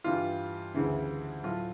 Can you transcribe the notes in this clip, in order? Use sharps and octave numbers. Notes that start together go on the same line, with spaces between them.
G2 E3 G3 F4
D2 C#3 E3
A2 F#3 A3 F4